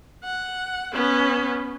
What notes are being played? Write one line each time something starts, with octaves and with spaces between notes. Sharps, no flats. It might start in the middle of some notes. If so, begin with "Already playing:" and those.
F#5
B3 C#4